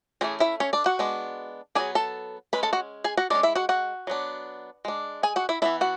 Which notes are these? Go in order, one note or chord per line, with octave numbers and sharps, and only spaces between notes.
E3 G#3 A3 C#4 G#4
E4 E5
C#4 C#5
D4 D5
F#4 F#5
G#3 B3 D4
F#3 B3 D4 G#4 G#5
A4 A5
G#3 C#4 B4 B5
A4 A5
F#4 F#5
G#4 G#5
F#4 F#5
G#3 C#4 D4 D5
E4 E5
F#4 F#5
F#4 F#5
F#3 B3 D4
G#3 D4
G#4 G#5
F#4 F#5
E4 E5
E3 B3 D4 E4 E5
F#4 F#5